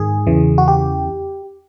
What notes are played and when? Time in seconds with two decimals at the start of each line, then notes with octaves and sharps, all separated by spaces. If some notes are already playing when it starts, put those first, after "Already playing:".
Already playing: G#2 D#3 G#4
0.27 E2 C#3 E3
0.58 F#4
0.68 G4